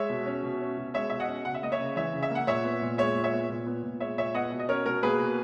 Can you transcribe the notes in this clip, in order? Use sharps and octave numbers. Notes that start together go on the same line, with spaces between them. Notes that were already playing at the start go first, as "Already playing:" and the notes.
Already playing: G#3 C#5 E5
B2
C#4
B2
C#4
B2
G#3 C#5 E5
B2 E5
D#5 F#5
C#4
C#3 F#5
E5
A#3 D#5
C#5 E5
C#3
E3 C#5 E5
C#3
E5
A#3 F#5
A#2 C#5 E5
B3
A#2
G#3 C#5 E5
A#2
C#5 E5
B3
A#2
B3
A#2
G#3 C#5 E5
A#2 C#5 E5
B3 D#5 F#5
B2
D#5
C#4 A#4 C#5
B2 A#4
A#3 G#4 B4
B2